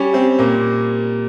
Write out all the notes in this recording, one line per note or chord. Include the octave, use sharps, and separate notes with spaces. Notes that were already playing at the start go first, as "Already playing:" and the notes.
Already playing: G3 C#4
G3 C4
A#2 A#3